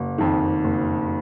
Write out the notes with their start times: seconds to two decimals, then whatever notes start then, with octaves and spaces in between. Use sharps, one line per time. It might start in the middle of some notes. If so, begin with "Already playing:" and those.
Already playing: F#1
0.18 F2 D#3
0.64 F#1